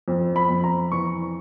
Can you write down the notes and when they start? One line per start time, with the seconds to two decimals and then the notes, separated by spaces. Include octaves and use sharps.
0.08 F2
0.36 B5
0.50 F2
0.64 A#5
0.92 E3 C#6